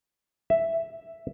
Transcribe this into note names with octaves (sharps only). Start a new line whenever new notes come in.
E5